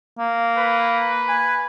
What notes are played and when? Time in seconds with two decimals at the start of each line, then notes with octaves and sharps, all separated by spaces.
0.19 A#3
0.58 B4
1.29 G#5